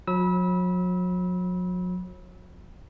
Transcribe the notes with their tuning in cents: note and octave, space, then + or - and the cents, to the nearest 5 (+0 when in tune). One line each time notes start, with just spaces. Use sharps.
F#3 -40 B5 -25 E6 -30